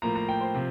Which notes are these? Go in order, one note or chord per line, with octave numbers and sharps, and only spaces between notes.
A2 F3 A#3 A#5
A#5
G5
C5
C3 F3